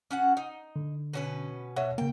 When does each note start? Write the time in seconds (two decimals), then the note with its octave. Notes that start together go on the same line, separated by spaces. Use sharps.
0.11 C#4 F#4 F#5
0.37 D#4
0.76 D3
1.13 B2 C#4 B4
1.76 B2 C#5 E5 F#5
1.98 C#3 A#3 G5